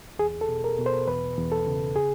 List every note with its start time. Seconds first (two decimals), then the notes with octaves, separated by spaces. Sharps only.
0.19 E2 G#4
0.41 A4
0.49 B2
0.64 A#4
0.79 B2
0.86 C5
1.07 E2 B4
1.37 E2
1.52 A4
1.67 C#3
1.96 G#4